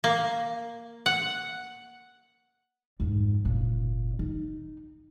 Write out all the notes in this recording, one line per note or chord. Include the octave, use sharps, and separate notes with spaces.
A#3
F#5
F2 G#2
F#1 A#2
D#4